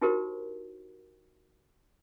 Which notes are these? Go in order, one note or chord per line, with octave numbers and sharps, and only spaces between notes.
D#4 E4 F#4 G4 A#4 C5